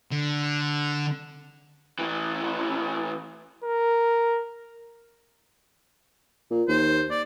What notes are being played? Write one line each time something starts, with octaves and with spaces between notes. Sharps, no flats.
D3
A2 E3
A#4
A#2
D#2 C5
D5